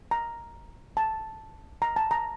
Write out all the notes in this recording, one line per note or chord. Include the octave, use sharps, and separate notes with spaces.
A#5
A5
A#5
A5
A#5